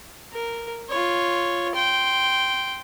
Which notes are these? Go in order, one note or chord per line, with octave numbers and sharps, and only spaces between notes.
A#4
F4 C#5
G5 C6